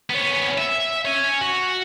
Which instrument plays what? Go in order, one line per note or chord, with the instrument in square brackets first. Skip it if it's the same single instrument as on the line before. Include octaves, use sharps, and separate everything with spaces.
[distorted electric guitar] B3 C#4
E5
C#5 G#5
F#4